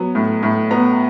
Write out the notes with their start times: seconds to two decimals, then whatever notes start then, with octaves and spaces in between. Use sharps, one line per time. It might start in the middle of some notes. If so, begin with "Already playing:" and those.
Already playing: F#3 B3
0.15 A2
0.43 A2
0.71 B3 A#5